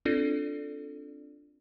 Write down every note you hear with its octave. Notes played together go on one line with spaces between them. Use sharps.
C4 D4 F4 A4 D5